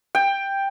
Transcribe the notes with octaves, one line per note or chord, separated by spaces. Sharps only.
G5